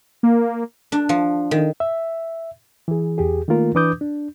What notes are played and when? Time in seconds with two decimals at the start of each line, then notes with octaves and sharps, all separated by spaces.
0.23 A#3
0.92 D4
1.09 F3
1.51 D#3
1.80 E5
2.88 E3 G#4
3.18 E2 G4 G#4
3.48 D#3 A3 A#3 F4 A#4
3.75 E3 D4 B4 D6 D#6 G6
4.01 D4